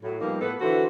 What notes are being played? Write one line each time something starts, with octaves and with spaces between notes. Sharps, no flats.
A2 F#3
F3 G3 A#3 B3 D#4
A2 B3 A4 B4
D3 E3 F#4 A4 C5